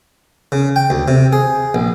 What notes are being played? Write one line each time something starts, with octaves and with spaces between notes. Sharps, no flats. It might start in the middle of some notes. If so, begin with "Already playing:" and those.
C#3
G5
D2
C3
G#4
A#1